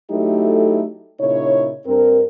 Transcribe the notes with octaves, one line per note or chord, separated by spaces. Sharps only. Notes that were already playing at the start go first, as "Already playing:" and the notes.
F#3 A3 D#4 E4 G4 A4
A#2 C#3 D#4 E4 C#5
G2 C4 A#4